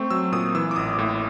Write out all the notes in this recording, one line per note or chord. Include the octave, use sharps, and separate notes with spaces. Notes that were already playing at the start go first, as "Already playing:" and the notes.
Already playing: A3 C4 C#6
F#3 E6
A#2 D#6
E3 E6
D6
A1 D#6
A2